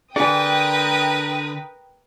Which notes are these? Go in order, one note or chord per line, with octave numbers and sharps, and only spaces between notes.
D3 D4 G#4 A#4 B4 G5 G#5 D#6